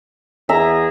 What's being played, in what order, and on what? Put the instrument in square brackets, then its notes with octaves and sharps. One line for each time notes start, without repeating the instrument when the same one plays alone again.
[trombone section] E2 B3 G#4 [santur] E5 A#5